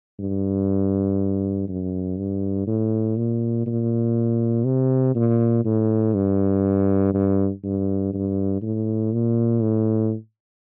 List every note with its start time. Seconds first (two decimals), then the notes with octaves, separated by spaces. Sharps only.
0.19 G2
1.68 F#2
2.18 G2
2.67 A2
3.17 A#2
3.66 A#2
4.65 C3
5.15 A#2
5.65 A2
6.14 G2
7.14 G2
7.63 G2
8.14 G2
8.62 A2
9.13 A#2
9.62 A2